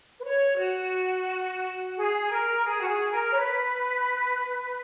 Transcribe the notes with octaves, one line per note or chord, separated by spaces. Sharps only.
B4
C#5
F#4
G#4
A#4
G#4
F#4
G#4
A#4
C#5
B4